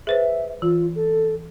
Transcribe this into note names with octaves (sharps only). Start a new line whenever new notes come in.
G#4 B4 C5 E5
E3 F4
A4